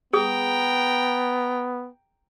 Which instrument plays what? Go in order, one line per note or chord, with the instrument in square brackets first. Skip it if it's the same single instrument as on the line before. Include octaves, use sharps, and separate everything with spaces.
[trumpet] B3 [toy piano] G#4 D#6 [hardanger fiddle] G5 A#5